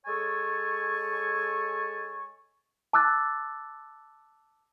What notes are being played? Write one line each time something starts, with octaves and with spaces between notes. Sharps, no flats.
G#3 A4 C#5 G#5 A5 C#6
A5 D6 E6 F#6 A6